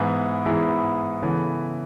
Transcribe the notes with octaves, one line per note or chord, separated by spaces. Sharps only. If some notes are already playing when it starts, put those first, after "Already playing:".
Already playing: G#2 E3 B3 E4 G#4
G#2 E3 B3 E4 G#4
C#3 E3 B3 E4 A4